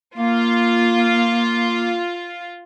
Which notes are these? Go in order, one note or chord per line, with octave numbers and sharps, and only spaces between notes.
A#3 F4